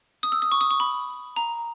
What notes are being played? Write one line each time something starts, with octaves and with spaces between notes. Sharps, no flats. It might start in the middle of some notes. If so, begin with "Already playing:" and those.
D#6
E6
D#6
C#6
D#6
C#6
B5
A#5